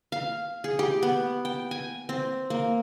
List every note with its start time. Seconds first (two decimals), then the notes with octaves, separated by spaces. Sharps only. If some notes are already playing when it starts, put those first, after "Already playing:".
0.12 F5
0.64 G#4
0.79 G4
1.03 B3
1.45 G5
1.71 G#5
2.09 C4
2.50 A#3